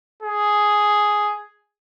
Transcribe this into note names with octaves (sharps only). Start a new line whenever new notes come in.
G#4